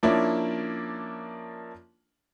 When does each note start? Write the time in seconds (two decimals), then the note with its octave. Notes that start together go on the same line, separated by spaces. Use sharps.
0.03 F3 A#3 C#4 D4 E4